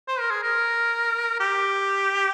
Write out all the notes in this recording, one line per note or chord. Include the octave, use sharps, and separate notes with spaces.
C5
A#4
G#4
A#4
G4